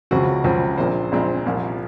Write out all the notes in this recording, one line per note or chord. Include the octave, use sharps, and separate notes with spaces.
C#2 C#3 F3 C4 F#4
C#2 C#3 F3 C4
A#1 A#2 G#3 C4 C5
A#1 A#2 G#3 C4
C2 A#2 F3